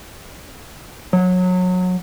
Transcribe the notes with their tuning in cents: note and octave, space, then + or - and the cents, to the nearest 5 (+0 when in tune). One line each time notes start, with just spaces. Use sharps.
F#3 -25